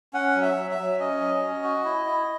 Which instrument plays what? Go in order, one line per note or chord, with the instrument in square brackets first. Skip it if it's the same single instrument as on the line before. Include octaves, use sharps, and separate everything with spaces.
[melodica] C#4 F#5
F#3
E5
F#3
E5
F#3
C#4 D#5
F#3
C#4
F#4
E4
E4